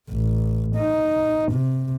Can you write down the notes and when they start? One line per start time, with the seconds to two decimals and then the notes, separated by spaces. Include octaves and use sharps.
0.10 A1
0.76 D#4
1.52 C3